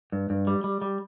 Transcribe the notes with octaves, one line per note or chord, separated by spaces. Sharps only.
G2
G2
G3
G3
G3